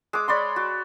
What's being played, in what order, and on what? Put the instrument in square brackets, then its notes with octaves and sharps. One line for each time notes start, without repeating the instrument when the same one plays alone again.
[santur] G#3 D6
C#5 D5 B5 C6
F#4